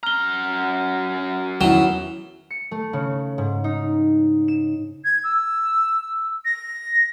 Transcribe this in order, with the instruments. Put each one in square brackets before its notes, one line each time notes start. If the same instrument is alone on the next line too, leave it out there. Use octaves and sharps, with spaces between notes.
[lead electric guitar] F#2 A#5 [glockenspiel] F6 G7
[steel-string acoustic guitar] E2 D#3 E4 [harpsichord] F#3 [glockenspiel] E7 G7
[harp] C#7
A3
C#3
G#2
D#4
E7
[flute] G#6
E6
A#6